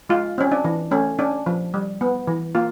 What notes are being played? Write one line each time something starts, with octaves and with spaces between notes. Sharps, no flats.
G#3 F4
C4 C#4
D4
E3
A3 C#4
C#4 D4
F3
G3
B3
E3
A#3 F4